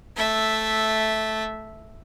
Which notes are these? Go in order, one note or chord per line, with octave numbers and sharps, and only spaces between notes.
A3 E5